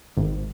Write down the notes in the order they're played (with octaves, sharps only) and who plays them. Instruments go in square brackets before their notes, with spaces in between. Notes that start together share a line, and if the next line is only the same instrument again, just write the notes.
[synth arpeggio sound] G#1